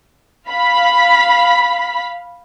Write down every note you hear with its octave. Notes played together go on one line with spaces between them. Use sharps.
F5 B5 B6